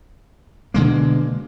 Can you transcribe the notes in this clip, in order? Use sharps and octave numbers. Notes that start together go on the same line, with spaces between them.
B2 D3 G#3 A#3